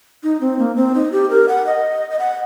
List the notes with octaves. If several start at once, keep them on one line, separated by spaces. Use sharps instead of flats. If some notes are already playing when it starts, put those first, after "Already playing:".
D#4
C4
A#3
C4
D#4
G4
A#4
F#5
D#5
D#5
F#5